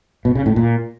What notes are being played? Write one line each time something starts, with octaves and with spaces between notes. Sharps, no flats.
B2
C#3
A2
A#2